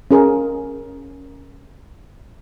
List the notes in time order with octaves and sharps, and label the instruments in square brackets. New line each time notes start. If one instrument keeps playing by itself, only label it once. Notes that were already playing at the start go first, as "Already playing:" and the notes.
[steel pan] C#4 G#4 A#4